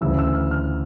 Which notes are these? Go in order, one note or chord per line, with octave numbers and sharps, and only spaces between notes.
D2 C#3 E3 E6
E6
F6
F6